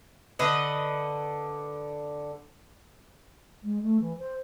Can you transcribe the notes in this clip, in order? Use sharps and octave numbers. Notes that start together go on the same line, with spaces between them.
D3 B4 D#5
G#3
A3
E3
C5